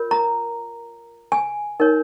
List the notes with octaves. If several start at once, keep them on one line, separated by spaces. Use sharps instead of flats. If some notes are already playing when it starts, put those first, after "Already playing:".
Already playing: F4 A#4 C#5
A#5
G#5
D#4 A#4 C#5